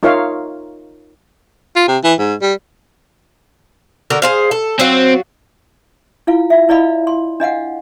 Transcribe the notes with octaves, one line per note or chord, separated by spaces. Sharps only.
D#4 F4 A#4 C#5 E5 F5
F4
C3
E3
G#2
G3
D3 F#4 A#4
G#4 C5 F5
A4
F#3 C4 F4 F#4
E4 F4 F5
E5
E4 D5 D#5 F5 B5
C6
D4 D#5 F5 F#5